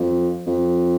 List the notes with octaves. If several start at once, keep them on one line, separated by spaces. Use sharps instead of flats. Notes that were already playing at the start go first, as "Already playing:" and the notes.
Already playing: F2
F2